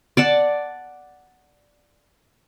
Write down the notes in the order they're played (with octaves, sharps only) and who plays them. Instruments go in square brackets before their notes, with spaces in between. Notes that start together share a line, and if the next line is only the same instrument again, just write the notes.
[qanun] D5 F#5 A5